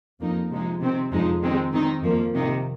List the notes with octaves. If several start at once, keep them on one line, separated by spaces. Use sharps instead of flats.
F2 F3 A#3 D#4
C3 F3 G#3 D#4
C3 D#3 C4
F2 F3 G#3 D#4
D#3 G#3 C4 D#4
D#3 C4 D#4
F2 F3 A#3
C3 D#3 A#3 D#4